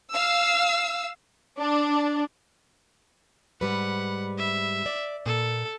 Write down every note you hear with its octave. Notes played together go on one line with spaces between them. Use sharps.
F5 E6
D4
G#2 G3 B4 F#5
E5
D5
A#2 A4